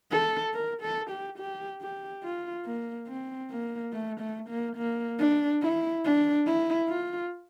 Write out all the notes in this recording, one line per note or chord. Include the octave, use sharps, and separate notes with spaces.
A4
A#4
A4
G4
G4
G4
F4
A#3
C4
A#3
A3
A3
A#3
A#3
D4
E4
D4
E4
F4